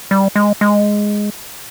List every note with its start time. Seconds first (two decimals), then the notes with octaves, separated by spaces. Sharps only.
0.11 G3
0.36 G#3
0.61 G#3